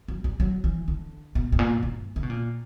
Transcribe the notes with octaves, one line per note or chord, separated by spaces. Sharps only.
F#3
G3
F#3
E3
D3
B2
G2
A#2
G2
C#3
B2
A#2